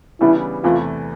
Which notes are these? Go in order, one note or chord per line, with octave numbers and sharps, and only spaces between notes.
C#3 E3 G3 B3 D4 E4
E2 C3 E3 A3 F4